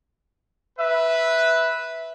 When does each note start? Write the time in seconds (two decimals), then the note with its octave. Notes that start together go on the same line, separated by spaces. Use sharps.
0.79 B4 E5